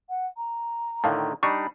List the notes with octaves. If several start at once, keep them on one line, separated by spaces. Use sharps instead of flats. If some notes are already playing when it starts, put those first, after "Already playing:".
F#5
A#5
A2 D3 D#3 F5 A5
G3 D4 D#4 B5 C#6